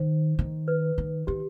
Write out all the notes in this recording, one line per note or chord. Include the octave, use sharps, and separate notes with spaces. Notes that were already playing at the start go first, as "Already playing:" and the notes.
Already playing: D#3 C5
D#3
B4
D#3
D#3 G4